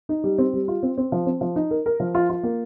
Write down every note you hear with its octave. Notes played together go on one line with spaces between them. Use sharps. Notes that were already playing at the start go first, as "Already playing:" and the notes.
D#4
G3
C4
G3
F4
C4
C4
F3
C4
F3
D#4
A#4
A#4
F3
F4
F4
A#3